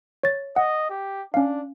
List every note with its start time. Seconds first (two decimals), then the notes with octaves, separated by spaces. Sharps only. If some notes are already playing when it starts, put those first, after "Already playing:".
0.23 C#5 A6
0.56 D#5 F#5
0.90 G4
1.34 C#4 D4 F5